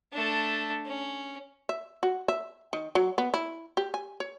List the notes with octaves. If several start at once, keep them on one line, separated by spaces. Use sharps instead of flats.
A3 D4
C#4
E5
F#4
E5
D#3
F#3
B3
E4
G4
G#5
C#5